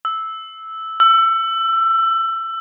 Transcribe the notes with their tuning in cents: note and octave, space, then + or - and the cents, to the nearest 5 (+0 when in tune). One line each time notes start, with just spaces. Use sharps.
E6 -10
E6 +25